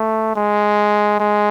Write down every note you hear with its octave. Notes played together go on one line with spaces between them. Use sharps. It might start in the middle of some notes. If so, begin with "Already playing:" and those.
Already playing: A3
G#3
G#3